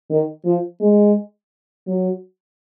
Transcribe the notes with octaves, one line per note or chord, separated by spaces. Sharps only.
D#3
F3
G#3
F#3